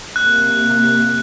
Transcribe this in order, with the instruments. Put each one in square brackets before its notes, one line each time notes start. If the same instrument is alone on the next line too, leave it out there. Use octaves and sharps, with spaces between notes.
[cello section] C3 A#3 [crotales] F#6